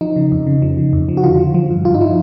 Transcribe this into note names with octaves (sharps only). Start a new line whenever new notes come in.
F3 D#4
C#3
F2
C#3
F3
C#3
F2
F3
F#4
D3 F4
F3
F3
G2
G2 F4
D#4
F3 E4